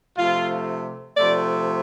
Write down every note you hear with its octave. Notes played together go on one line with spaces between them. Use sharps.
C3 F3 A3 F4
C3 F3 A3 D5